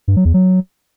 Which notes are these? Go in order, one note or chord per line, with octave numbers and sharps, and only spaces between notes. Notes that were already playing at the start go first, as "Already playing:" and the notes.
G2
F#3
E2
F#3